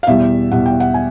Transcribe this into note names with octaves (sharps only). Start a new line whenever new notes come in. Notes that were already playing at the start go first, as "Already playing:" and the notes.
F5
E2 B2 G3 E5
E2 B2 G3 F#5
G5
F#5
G#5